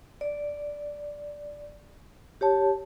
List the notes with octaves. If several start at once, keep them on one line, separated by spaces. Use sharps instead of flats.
D5
G4 C#5 A5